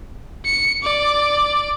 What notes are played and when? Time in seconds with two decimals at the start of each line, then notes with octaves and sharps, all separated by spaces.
0.46 C#7
0.83 D5